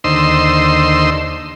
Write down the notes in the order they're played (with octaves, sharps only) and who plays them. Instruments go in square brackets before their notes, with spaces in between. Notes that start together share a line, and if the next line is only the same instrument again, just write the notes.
[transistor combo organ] D#2 D3 C5 D#5 C6 E6